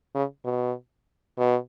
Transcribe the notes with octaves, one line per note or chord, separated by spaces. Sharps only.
C#3
B2
B2